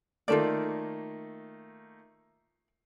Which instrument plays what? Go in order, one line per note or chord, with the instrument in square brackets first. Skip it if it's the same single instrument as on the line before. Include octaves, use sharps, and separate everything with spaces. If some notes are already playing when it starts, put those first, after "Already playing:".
[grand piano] D#3 A3 A#3 [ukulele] F4 A4 D5